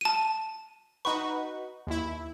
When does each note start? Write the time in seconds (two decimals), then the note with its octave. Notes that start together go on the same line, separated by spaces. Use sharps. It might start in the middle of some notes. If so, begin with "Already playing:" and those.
0.01 A5 D#7
1.05 D#4 F#4 B4 C#6
1.87 D#2 E4